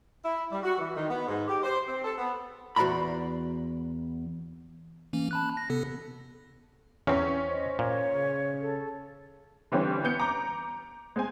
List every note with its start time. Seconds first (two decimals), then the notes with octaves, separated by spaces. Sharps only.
0.24 E4
0.52 G3
0.63 F#4
0.78 E3
0.95 D#3
1.09 B3
1.27 G#2
1.48 G4
1.63 C5
1.88 C4
2.04 A4
2.18 B3
2.76 E2 F#4 C5 D5 A#5 B5
5.13 E3 A#3 C#4
5.31 A5 B5 F#6
5.57 A#6
5.70 C3 B3 A4
7.07 E2 C4 C#4
7.49 C5 D#5
7.79 A#2 C#5
8.13 C#3
8.60 A4
9.72 D3 E3 G3 C4 C#4
10.04 B3 G6 C#7
10.20 A#5 D6
11.16 G#3 C4 G#5